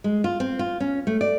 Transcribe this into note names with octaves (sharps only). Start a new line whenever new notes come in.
G#3
F4
C4
F4
C#4
A3
D5